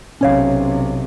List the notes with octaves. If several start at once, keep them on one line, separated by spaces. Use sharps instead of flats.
B1 C3 C#4 C#5 F5